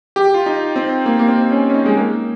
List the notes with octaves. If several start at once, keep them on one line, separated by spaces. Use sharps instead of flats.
G4
F4
D#4
C4
A#3
A#3
C4
C#4
C#4
D#4
G#3
A#3